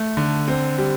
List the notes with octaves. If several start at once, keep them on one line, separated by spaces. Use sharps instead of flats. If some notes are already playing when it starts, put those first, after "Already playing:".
Already playing: A3
D3
C4
G3